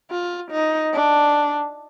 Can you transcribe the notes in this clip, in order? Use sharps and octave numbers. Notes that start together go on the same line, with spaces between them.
F4
D#4
D4